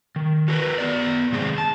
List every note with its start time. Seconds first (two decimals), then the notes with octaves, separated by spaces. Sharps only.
0.16 D#3
0.48 F#4 A#4 B4
0.78 B3 D5
1.32 C3 D#3 G#3 C4 G#4
1.58 A5